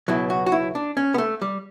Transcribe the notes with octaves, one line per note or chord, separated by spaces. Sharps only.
C#2 B2 F#3 E4
F#4
F#4
E4
D4
C#4
B3
A3
G3